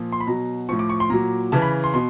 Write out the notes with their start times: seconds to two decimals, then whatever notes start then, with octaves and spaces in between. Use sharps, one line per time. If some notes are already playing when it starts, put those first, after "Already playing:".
Already playing: A#2 F3
0.12 C6
0.20 B5
0.27 B2 F#3 A#5
0.69 A2 F3 C#6
0.79 D6
0.89 C#6
1.00 C6
1.10 A#2 F#3 A#5
1.52 C#3 E3 A5
1.62 B5
1.84 C6
1.94 B2 C6